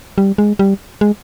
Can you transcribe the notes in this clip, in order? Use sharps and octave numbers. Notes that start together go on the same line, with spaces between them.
G3
G#3
G3
G#3